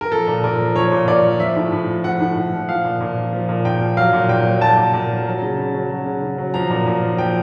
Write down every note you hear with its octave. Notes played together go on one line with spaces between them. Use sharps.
A#4
F3 A4
A#2
A#2 A#4
F3
F3 C#5
A#2
A#2 D5
F3
F3 E5
A2
A2
F3
F3 F#5
A2
A2
F3
F3 F5
A#2
A#2
F3
F3
A#2
A#2 G5
F3
F#3 F5
A#2
A#2 G5
F#3
F#3 A5
A#2
A#2
F#3
F#3
C#3
C#3
F#3
F#3
C#3
C#3
F#3
F3 A#5
A#2
A#2
F3
F3 G5